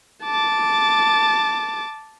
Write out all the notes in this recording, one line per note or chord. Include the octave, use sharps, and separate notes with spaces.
A5 D6